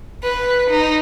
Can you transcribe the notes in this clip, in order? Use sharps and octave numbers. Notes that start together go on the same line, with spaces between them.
B4
D#4